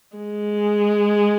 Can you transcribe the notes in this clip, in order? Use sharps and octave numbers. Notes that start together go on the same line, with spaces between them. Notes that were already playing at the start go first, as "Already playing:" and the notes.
G#3